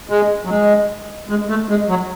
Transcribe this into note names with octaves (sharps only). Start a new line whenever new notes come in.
G#3
F#3
G#3
G#3
A3
G#3
F#3